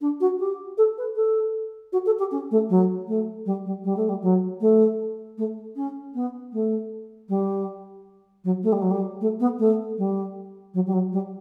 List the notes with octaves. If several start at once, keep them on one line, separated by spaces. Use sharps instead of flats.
D4
F#4
G4
A4
B4
A4
F#4
A4
G4
C#4
A3
F#3
A3
G3
G3
G3
A3
G3
F#3
A3
A3
C#4
B3
A3
G3
F#3
A3
G3
F#3
G3
A3
B3
A3
G3
F#3
G3
F#3
G3